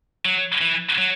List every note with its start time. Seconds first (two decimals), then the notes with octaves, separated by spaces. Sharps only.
0.25 F#3
0.61 E3
0.98 F#3